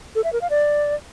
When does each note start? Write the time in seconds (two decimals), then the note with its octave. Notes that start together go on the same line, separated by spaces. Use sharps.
0.15 A4
0.24 E5
0.33 A#4
0.41 F5
0.50 D5